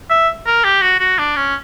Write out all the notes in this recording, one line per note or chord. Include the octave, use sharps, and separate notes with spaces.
E5
A#4
G4
F#4
F#4
D4
C#4